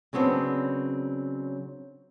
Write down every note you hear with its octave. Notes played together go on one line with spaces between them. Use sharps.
C#3 F#3 B3 C4 D4